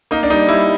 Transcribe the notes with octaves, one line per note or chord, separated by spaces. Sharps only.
A#3 D#4
D4
G3 D#4
G3 E4